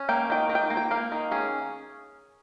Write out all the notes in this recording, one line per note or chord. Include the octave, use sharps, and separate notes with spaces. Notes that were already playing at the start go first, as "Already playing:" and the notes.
Already playing: C#4
A#3 G5
D#3 G5
D#3
G5
A#3
G5
A#3 F5
D#3
C#4 G#4